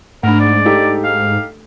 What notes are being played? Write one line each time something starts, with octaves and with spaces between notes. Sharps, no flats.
G#2 A3 D4 A#4
D5
D#4 G4 A4
F5